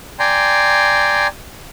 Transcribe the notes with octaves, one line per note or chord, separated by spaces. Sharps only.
D5 G5 G#5 A#5 C6